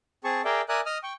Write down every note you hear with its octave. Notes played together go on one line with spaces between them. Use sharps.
C4 G#4 A5 C#6
G#4 A#4 D5 E5 G5
A#4 D5 E5 G#5 D#6 F#6
D#5 D#6 F6
G5 C#6